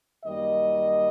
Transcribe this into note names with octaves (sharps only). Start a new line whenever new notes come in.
F#2 D#3 G3 A#3 D#5